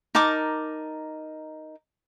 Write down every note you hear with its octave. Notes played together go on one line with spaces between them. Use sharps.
D#4 A#4 A5 D6